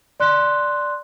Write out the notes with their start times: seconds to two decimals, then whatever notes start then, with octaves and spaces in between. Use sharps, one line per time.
0.20 D5 C6 F#6